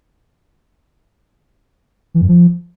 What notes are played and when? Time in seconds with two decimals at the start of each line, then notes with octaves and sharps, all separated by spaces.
2.14 E3
2.21 F#2
2.28 F3